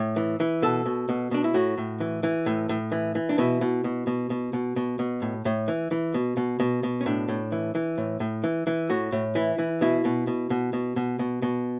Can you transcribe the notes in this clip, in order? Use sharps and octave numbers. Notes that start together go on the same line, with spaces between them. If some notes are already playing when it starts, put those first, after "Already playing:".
Already playing: A2
E3
E3
B2 A4
B2
B2
B2 D4
E4
A2 F#4
A2
E3
E3
A2
A2
E3
E3
D4
B2 E4
B2
B2
B2
B2
B2
B2
B2
A2
A2
E3
E3
B2
B2
B2
B2
C#4
A2 D4
A2
E3
E3
A2
A2
E3
E3
A2 F#4
A2
E3 E4
E3
B2 E4
B2
B2
B2
B2
B2
B2
B2